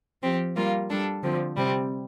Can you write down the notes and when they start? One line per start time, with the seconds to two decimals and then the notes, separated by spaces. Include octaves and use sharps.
0.22 F3 C4 G4
0.56 G3 A#3 F4
0.89 G3 D4 A4
1.23 D3 F3 C4
1.57 C3 G3 C4